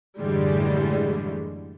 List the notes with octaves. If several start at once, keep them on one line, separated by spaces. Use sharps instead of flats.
F#2 A2 D3 E3 G3 G#3